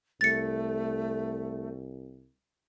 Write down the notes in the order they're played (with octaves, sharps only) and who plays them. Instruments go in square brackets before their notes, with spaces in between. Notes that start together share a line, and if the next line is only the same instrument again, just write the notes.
[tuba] C2 [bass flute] A3 [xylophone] A6 C#7